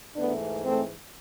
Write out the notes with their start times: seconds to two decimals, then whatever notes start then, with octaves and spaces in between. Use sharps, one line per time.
0.16 G#2 E3 A3 B3 D4
0.65 A3 C4